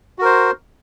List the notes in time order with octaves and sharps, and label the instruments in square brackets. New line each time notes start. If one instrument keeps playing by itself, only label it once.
[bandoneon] F#4
A#4
C5